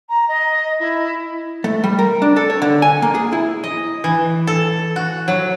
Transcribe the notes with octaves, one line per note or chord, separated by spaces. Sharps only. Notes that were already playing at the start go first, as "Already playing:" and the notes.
A#5
D#5
E4
A3
G3
A#4
D4
A4
C#5
D3
G#5
A#3
G#4
E4
D#5
E3
A4
F#4
F#3